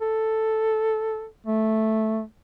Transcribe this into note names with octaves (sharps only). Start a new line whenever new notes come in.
A4
A3